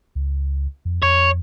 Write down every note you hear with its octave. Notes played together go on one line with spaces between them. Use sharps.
C#2
F2
F2 C#5